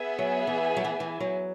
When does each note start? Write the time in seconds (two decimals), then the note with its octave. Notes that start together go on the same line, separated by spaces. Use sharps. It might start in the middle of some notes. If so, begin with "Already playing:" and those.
Already playing: B3 G#4 E5 G#5
0.19 F#3
0.47 E3
0.77 F#3
0.84 E3
1.00 E3
1.20 F#3